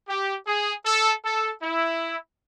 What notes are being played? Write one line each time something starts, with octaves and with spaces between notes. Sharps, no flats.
G4
G#4
A4
A4
E4